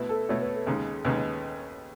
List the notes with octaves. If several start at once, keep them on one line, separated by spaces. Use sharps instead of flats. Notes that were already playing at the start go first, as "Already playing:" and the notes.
Already playing: B2 A3 E4 B4
A4
B2 A3 E4 C#5
B4
A4
D#2 C#3 G#3 D#4 G#4
D#2 C#3 G#3 D#4 B4